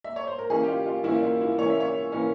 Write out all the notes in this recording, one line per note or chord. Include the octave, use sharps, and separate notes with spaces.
E5
C#5
C5
A#4
E3 A#3 C#4 G#4
G4
F4
F4
E3 A#3 C#4 E4
F4
E4
E3 A#3 C#4 C#5
E5
C#5
E3 A#3 C#4